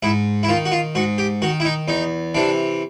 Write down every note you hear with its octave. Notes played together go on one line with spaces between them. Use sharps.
G#2 E4
E4
D#3 F4
F#4
F4
G#2 F#4
G4
D#3 F#4
E4
D#4
E2 D#4
C3 E3 D4